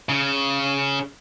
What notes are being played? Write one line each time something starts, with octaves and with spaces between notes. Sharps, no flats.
C#3